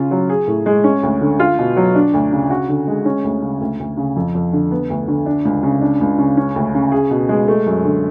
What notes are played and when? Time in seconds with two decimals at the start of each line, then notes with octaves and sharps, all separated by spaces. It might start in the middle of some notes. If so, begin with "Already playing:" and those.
Already playing: C#3 F4
0.11 F#3
0.29 G#4
0.47 A2
0.66 G#3
0.84 C#4
1.03 D2
1.21 D3
1.40 F4
1.58 B2
1.76 F#3
1.95 D4
2.14 D2
2.32 C#3
2.50 F#4
2.69 D3
2.87 G#3
3.05 C#4
3.24 D2
3.42 C#3
3.60 D2
3.79 D2
3.97 C#3
4.16 F2
4.35 F2
4.53 D3
4.71 B3
4.90 D2
5.08 D3
5.26 D4
5.45 C#2
5.63 C#3
5.81 D4
6.01 C#2
6.18 C#3
6.37 C#4
6.56 D2
6.74 C#3
6.92 G#4
7.11 B2
7.29 G#3
7.48 A3
7.66 F#2
7.85 D3